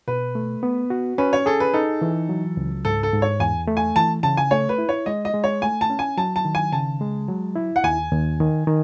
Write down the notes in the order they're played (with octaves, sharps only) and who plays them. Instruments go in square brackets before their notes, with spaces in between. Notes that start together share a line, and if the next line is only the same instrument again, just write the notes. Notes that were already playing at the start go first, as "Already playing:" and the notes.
[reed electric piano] B2 [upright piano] B4
[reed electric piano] A3
B3
F#4
[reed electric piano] C#4 [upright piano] B4
[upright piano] C#5
[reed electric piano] G#4 [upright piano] A4
[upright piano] B4
[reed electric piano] D#4 [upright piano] A4
[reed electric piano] E3
F#3
C#2
[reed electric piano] G#2 [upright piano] A4
[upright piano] A4
[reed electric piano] G#2
[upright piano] C#5
[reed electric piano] E2 [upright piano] G#5
[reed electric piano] A3
[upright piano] G#5
[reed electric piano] E3 [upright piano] A5
[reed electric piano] C#3 [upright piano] A5
[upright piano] G#5
[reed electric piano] A3 [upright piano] C#5
[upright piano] B4
[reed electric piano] E4
[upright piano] C#5
[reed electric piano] G#3 [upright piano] D#5
[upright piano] D#5
[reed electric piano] G#3
[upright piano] C#5
[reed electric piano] A3 [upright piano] G#5
[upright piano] A5
[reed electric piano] C#4
[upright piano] G#5
[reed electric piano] F#3 [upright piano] A5
[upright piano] A5
[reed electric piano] D#3
[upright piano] G#5
[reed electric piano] C#3 [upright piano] A5
[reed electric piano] G#3
F#3
E4
[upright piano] F#5
[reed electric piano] D#2 [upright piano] G#5
[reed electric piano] D#2
D#3
D#3